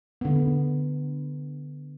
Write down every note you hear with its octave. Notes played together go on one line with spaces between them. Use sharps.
D3 B3